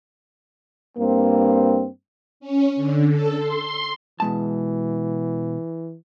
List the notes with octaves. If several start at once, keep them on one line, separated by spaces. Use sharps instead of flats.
G2 A#3 C4
C#4
D3
A4
C6
B2 E3 G#3 A5